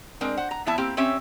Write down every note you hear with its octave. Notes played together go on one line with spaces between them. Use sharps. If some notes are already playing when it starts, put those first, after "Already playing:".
G#3 C4 D4 A#4
C5 F#5
A#5
E3 B3 E4 E5 A5
A#3 C4 E4 G4
C4 C#4 G4 C#5 E5